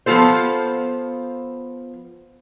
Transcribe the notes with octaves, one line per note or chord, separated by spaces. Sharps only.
F3 B3 D#4 F4 A4 C5